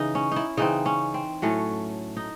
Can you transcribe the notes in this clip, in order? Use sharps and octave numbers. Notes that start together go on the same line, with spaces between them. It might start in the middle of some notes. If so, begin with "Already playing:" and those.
Already playing: C#3 E3 D#4
C#4
D#4 E4
C#3 E3 C4 D#4
C#4
C4
A2 F#3 A3 C#4
D#4